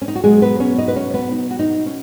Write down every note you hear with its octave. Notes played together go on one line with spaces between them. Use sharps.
C#4
D#4
F#4
B2 F#3 G#3 B3 G#4
B3 B4
C#4 C#5
D#4 D#5
B4
C#4 C#5
B3 B4
D#4
F#4
D#4
C#4